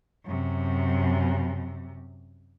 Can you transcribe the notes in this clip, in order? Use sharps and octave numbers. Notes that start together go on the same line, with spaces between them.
F#2 C3